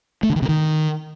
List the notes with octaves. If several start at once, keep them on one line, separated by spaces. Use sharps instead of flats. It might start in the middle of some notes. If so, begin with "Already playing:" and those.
A3
D3
D#3
C3
D#3